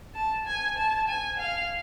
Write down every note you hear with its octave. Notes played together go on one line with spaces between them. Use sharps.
A5
G#5
A5
G#5
F5